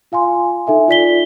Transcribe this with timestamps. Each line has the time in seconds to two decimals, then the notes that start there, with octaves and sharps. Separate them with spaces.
0.12 F4 F5 G#5 C6
0.67 D#4 A4 E5 G#5
0.88 F4 D5 B6 G7